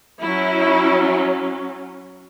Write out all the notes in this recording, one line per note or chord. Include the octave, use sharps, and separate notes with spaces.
F#3 C#4 E4